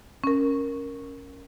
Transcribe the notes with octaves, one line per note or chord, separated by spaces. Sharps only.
C#4 A#4